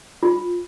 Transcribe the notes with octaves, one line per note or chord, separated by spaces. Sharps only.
F4